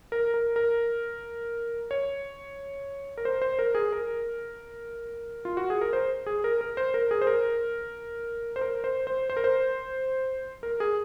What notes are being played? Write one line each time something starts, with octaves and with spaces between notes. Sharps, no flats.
A#4
A#4
A#4
C#5
A#4
C5
C5
A#4
G#4
A#4
F4
F#4
G#4
A#4
C5
G#4
A#4
A#4
C5
A#4
G#4
C5
A#4
C5
A#4
C5
C5
C5
A#4
C5
A#4
G#4